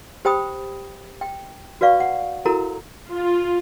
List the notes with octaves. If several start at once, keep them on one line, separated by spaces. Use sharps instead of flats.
G4 C5 G5 B5 D#6
G5
F#4 B4 D5 F5 C#6
F#5
E4 F#4 A4 A#4 A#5
F4